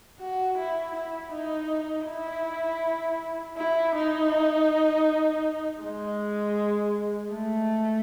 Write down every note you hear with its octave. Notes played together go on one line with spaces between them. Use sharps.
F#4
E4
E4
D#4
E4
E4
D#4
G#3
A3